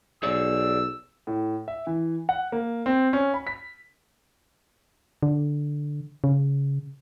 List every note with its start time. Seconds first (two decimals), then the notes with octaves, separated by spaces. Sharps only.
0.23 B1 G#4 C#5 D5 E6
1.27 A2
1.68 E5
1.87 E3
2.29 F#5
2.52 A#3
2.86 C4
3.13 C#4
3.34 B5
3.47 B6
5.23 D3
6.24 C#3